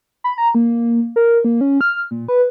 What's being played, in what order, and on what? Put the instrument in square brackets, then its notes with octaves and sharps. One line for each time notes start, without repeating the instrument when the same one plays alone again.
[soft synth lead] B5
A#5
A#3
A#4
A#3
C#4
F6
A#2
B4